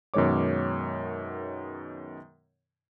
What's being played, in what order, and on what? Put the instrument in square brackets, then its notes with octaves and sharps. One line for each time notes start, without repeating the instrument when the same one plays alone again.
[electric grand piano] F#2 B2 D#3 G#3 C#5 D6